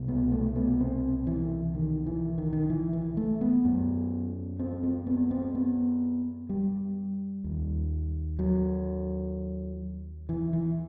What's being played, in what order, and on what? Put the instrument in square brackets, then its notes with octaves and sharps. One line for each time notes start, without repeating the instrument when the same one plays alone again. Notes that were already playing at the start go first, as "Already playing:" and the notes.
Already playing: [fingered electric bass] C2 B2
B3
A3
B3
C4
E3
D#3
E3
D#3
D#3
E3
E3
A3
B3
F#2
C4
C4
B3
C4
B3
G3
D#2
F#3
E3
E3